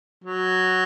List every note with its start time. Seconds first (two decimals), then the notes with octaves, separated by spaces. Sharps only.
0.24 F#3